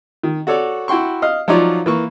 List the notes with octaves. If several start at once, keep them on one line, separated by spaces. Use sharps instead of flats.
D#3
F#4 A4 C#5 D5
E4 F#4 G5 C6 C#6
D#5 F5 F6
F3 F#3 D#4 F4 C#5 D5
E3 A#3 C#6